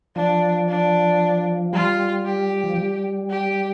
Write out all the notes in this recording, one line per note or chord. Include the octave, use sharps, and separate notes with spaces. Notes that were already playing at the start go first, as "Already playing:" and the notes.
F3 D4
D4
G3 F4
G4
F3
G3
G4